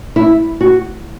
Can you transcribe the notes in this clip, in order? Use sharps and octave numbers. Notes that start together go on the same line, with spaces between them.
E4
F#4